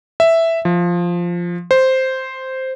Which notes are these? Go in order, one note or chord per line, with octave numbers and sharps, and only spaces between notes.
E5
F3
C5